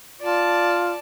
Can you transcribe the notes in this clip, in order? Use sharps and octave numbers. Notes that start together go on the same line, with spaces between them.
F4 D5 A5